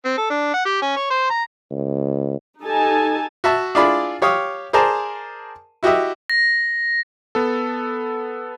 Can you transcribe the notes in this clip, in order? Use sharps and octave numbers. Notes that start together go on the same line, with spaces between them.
C4
A4
D4
F#5
G4
C#4
C#5
C5
A#5
C#2
D#4 G4 A4 G#5 A5
F#4 E5 A5 C#6
D4 E4 F4 G#4 D5 B5
G4 C#5 F5 D#6
G#4 A#4 C5 D5 A5 A#5
E4 F#4 G4 D#5 E5
A#6
B3 A4